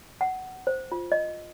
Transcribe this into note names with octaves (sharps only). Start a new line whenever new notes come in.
F#5
C5
F4
D#5